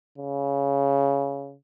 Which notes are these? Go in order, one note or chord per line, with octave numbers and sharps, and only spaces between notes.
C#3